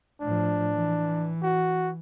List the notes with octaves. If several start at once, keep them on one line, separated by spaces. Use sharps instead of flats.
A2 F3 D4
E3
F#4